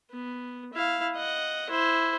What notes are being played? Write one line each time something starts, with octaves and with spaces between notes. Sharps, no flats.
B3
E4 F5
D#5 F#5
E4 C5